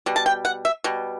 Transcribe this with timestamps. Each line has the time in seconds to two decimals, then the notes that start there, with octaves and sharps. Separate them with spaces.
0.06 B2 G3
0.16 A5
0.26 G5
0.45 F#5
0.65 E5
0.84 B2 G3